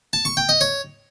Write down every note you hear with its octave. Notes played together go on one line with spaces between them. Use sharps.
A5
C#6
G5
D#5
C#5